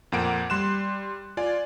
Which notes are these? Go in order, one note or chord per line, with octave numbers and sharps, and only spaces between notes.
F2 A#2 A#3 F#5 D7
G3 C6 F#6 E7
F4 D5 G#5